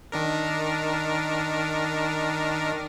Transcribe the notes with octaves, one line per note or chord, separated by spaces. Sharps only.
D#3 D4 A#4